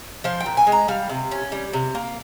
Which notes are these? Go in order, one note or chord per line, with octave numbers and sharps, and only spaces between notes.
F3 C5
G5
A#2
G#5
G#3
A#5
G3 F5
C3
C#4
G3
C3
A#3